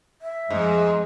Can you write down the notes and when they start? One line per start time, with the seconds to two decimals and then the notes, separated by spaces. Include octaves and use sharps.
0.22 E5
0.51 F2 G#2 G#3 D#5